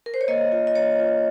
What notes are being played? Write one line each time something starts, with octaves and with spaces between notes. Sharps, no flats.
A#4
C5
C#5
A#3 D#5
F4
D#5
A#3 C#5
F4